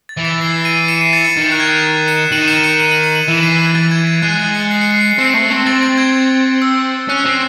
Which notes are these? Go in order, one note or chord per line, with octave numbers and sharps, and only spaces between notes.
A6
E3
A6
C7
C7 D#7
C#7 E7
C7 D#7
A6 C#7
A6 C#7
D#3 A6
F#6
G#6
C#7 E7
D#3 D#7 F#7
C#7 E7
C#7 E7
D#7 F#7
D#7 F#7
C#7 E7
D#7 F#7
E3
C7 D#7
E3 A6
G#6
G#6
G#3 F#6
A6
A6 C#7
C7
C#7
C7
C#7
C7
C4 C#7
A3 C7
C4
C4 A6
A6
G#6
E6
C#4 F#6
C4